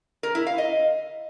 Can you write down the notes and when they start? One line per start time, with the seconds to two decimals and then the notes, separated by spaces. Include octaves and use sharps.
0.23 A#4
0.35 E4
0.47 F5
0.58 D#5